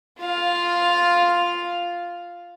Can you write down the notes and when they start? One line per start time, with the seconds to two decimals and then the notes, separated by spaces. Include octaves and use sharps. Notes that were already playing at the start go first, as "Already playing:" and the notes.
0.20 F4 F5